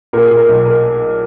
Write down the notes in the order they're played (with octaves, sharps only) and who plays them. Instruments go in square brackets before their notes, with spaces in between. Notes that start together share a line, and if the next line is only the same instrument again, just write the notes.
[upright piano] A#2 A#4
G#4
A#2
A#4
B1
A#4